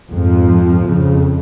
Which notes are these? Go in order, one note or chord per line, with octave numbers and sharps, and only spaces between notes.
F2 G#2 F3
F2 C#3